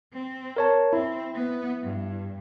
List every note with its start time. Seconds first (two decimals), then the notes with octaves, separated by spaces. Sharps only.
0.13 C4
0.56 A#4 C#5 A5
0.93 C4 E4
1.35 B3
1.83 G2